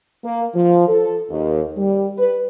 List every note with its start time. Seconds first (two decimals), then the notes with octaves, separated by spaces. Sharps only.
0.23 A#3
0.54 F3
0.88 A4
1.30 D#2
1.76 G3
2.17 B4